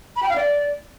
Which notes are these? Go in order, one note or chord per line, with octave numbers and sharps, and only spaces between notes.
B5
G5
F5
D5